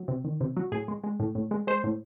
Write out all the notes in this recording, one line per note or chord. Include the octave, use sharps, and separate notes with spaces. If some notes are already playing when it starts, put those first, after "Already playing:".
Already playing: F#3
C3
D#3
C3
F#3
A2 G#4
G#3
G#3
A2
A2
G#3
G#3 C5
A2